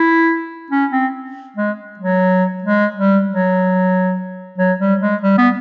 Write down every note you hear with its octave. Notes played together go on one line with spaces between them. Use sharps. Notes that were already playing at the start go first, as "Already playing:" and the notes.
Already playing: E4
C#4
C4
G#3
F#3
G#3
G3
F#3
F#3
G3
G#3
G3
B3